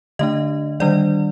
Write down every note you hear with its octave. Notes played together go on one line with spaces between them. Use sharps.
D3 A3 D4 D#5
D#3 G3 D4 D5